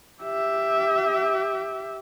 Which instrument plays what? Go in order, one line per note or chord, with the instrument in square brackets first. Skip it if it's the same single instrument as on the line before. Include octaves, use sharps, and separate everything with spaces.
[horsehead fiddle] G4 E5